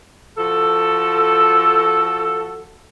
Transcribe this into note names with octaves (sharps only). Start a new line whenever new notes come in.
F3 F#4 A4